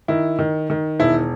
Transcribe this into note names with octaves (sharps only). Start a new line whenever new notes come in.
D#3 E4
D#3
D#3
E1 E4